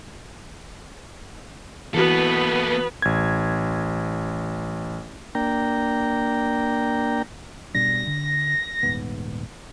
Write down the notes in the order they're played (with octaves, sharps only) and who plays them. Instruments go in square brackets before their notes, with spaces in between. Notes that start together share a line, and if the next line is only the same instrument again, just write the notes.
[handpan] E3 F#4 [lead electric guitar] A#3 A4 [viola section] B3 B4
[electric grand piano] A1 G#6
[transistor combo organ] A#3 D4 G5 A#5
[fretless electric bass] B2 G3 D4 [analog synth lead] A#6
[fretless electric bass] D3
D#1 G#2 B3